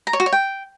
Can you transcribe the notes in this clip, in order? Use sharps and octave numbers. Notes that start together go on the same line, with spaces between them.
A#5
C#5
F#4
C#5
G5